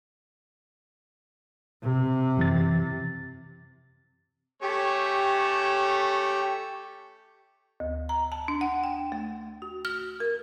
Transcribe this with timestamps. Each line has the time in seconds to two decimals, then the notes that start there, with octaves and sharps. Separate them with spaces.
1.83 C3
2.37 F#2 E3 A6
4.63 A3 C#4 G4 C#5
7.80 D2
8.09 A#5
8.32 A5
8.48 D4
8.61 F#5
8.84 G5
9.12 A3
9.62 F#4
9.85 F6
10.20 A#4